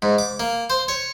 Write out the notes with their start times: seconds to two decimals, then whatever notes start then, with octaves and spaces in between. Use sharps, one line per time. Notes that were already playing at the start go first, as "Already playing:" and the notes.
0.02 G#2
0.18 D6
0.40 A#3
0.70 C5
0.88 C#5